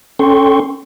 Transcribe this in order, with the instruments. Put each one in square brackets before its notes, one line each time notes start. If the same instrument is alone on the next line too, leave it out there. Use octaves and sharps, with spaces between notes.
[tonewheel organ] C#4 A4 G5 C6 C#6